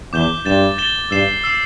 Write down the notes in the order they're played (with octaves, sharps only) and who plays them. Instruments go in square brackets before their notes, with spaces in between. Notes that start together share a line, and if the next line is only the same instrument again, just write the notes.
[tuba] E2 [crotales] D6 G6 E7 G7
[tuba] G2 [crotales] A6 E7 G7
[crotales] A6 E7 G7
[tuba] G2 [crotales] E6 C7 E7 G7
[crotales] E6 C7 E7 G7